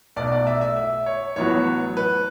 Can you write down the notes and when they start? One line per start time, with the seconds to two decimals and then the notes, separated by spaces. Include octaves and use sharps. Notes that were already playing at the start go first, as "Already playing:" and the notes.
0.16 B1 B2 A3 D5
0.32 D5
0.47 E5
0.61 E5
0.77 E5
1.06 C#5
1.36 A1 A2 F#3 B3 C#5
1.97 B4